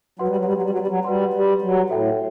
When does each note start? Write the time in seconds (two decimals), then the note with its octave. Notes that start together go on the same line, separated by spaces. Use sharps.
0.19 F#3 F#4 B4 F#5 C6
0.28 G3
0.36 F#3
0.45 G3
0.53 F#3
0.62 G3
0.70 F#3
0.79 G3
0.87 F#3
1.05 G3 F#4 B4 F#5 C6
1.33 G3
1.62 F#3
1.89 A2 F#4 A4 E5 G5